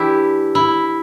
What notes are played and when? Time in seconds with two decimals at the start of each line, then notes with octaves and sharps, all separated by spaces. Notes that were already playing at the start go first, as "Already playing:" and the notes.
Already playing: E3 D4 E4 G4
0.55 E4